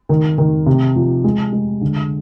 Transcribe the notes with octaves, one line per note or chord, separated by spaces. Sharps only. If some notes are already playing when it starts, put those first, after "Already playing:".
D#3
D#3
C3
F3
G#3
G#3
D3